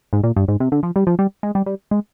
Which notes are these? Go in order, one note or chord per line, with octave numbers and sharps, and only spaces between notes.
G#2
A#2
G2
G#2
C3
D3
F3
G3
F3
G3
G#3
G3
G3
G#3